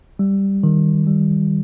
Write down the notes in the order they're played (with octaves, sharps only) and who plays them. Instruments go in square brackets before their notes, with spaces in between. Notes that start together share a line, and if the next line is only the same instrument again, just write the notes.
[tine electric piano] G3
D#3
G3